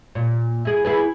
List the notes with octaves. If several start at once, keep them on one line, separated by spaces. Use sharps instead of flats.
A#2
E4 G#4
E4 G#4 B4